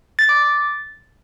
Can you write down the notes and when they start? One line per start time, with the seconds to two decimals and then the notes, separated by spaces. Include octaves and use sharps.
0.19 A6
0.29 D6
0.39 A6